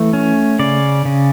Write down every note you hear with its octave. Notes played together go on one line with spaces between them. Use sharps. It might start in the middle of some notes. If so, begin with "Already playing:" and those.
Already playing: E3 A3
C#4
C#3 D5
C#3